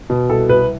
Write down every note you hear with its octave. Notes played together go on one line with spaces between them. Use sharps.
B2
C2 A4
C2 B4